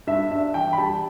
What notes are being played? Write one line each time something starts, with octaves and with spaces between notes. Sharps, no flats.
G2 E5
D4 E5
E3 G5
B5
G3 A5